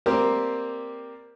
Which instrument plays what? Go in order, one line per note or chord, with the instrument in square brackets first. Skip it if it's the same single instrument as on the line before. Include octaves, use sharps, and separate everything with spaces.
[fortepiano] G3 A#3 C4 G4 A#4